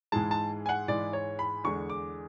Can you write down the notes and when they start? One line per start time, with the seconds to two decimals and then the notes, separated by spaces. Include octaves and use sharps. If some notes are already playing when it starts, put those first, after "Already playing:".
0.12 G#2 E3 G#3 A5
0.31 A5
0.66 G#5
0.69 F#5
0.88 G#2 E3 G#3 D5
1.13 C#5
1.39 B5
1.64 E2 D3 G#3 C#6
1.90 D6